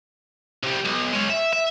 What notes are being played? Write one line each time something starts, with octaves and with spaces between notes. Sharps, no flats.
C3 G3
B1
G#3 C#4
E5
E5